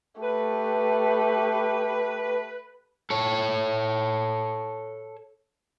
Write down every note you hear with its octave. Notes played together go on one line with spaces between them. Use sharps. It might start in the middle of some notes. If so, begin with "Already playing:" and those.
A3 G4 B4
A4 C#5